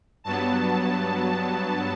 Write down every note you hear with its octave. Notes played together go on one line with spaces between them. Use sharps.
G2 F#3 B3 A5